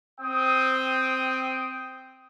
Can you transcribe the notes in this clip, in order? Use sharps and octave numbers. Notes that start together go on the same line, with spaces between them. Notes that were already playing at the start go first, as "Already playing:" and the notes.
C4 G5 D#6